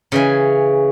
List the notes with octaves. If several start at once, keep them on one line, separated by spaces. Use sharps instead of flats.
C#3 E3 G#5